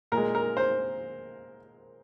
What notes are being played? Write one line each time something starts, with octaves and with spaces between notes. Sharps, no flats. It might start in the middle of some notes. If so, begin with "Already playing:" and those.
A#2 A#4
G#3
A#4
C5